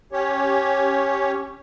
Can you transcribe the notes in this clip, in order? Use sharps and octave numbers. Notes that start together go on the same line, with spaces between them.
C#4 G4 C#5